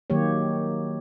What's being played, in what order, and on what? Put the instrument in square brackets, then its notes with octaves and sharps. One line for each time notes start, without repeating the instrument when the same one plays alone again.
[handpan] D#3 F#3 A#3 G4 C#5